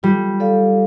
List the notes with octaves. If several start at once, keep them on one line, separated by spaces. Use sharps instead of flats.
G3 F4
A4 D5 F5